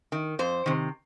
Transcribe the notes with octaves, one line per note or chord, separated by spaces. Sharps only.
D#3
F2 C5
C3 D#3